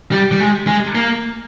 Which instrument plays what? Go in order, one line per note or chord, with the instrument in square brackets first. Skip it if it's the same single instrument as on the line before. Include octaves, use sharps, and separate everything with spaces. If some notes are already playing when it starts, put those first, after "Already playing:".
[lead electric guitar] G3
G3
G#3
G#3
A#3